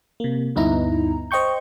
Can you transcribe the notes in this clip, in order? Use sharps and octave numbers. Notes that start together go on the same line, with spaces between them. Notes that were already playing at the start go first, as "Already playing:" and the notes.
C3 A#3
D2 G2 B3 D#4 E4 A#5
C5 D#5 G5 C#6 G6